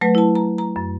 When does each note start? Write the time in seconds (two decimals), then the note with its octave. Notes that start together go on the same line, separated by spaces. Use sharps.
0.01 F#3 A3 B4
0.15 E4 A5
0.35 A#5
0.58 A#5
0.76 F#2